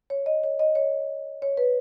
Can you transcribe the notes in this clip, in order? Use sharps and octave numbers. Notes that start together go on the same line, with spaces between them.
C#5
D#5
C#5
D#5
C#5
C#5
B4